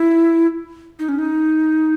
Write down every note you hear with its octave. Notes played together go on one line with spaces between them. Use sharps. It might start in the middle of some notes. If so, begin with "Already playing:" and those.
Already playing: E4
D#4
C#4
D#4